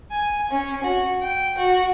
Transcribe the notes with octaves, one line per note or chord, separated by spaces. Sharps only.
G#5
C#4
F#4
G5
F#4